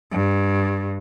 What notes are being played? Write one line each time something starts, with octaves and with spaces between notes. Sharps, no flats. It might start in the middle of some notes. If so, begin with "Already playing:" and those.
G2